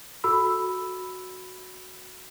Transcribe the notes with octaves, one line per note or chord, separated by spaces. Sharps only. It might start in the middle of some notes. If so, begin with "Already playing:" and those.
F#4 A4 B5 E6